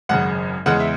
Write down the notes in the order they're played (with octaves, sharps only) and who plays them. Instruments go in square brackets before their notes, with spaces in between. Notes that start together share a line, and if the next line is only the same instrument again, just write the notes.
[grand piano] G#1 F#2 C#3 F#5
E2 C#3 G#3 F#5
E5